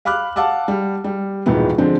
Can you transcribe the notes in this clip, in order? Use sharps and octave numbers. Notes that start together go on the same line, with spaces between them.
F5 B5 D6 F6 F#6
F5 F#5 A5 D6 E6
G3
G3
D#1 G#2 B2 D#3 E3 B3
D3 F3 G#3 C4 D4